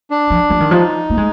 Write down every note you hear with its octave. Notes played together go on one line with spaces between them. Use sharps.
D4
F3
F3
D#3
F3 D#4
A#3
G#3